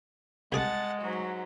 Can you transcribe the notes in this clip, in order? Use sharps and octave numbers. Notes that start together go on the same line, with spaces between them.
C2 G#3 G#4 F#5 A5 D6 A6
G#2 F#3 F#4